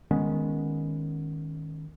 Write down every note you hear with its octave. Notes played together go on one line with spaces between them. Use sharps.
D#3 G#3 B3 C#4